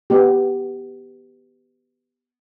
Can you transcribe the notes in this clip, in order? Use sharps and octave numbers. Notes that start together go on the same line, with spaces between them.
B3 G4